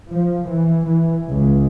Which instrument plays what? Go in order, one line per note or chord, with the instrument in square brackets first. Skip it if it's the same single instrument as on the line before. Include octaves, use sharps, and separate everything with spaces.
[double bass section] F3
E3
E3
C#2